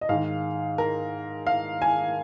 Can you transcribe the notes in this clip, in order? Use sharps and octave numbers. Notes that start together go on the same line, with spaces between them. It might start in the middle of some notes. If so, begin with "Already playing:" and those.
D#5
G#2 D#3 F5
A#4
F5
G#5